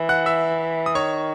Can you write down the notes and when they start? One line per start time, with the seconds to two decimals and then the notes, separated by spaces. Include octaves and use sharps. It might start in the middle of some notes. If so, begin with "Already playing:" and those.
Already playing: E3
0.09 F#5 F#6
0.26 E5 E6
0.86 D#6
0.95 D#3 C#5 C#6